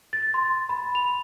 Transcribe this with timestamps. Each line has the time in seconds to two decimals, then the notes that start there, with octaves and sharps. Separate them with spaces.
0.13 A6
0.34 C6
0.69 B5
0.95 F7